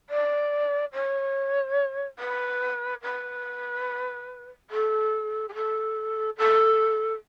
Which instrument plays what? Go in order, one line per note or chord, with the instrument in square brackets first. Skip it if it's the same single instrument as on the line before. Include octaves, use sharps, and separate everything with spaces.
[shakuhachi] D5
C#5
B4
B4
A4
G#4
A4
A4